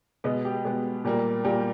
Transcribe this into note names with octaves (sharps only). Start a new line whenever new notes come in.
B2 G#3 B3 D#5
G4
B2 G#3 B3
A#2 G3 A#3
A#2 G3 A#3 G4